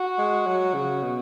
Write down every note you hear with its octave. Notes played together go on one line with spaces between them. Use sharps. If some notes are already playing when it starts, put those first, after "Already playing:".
Already playing: F#4
G#3
F#3
C#3
B2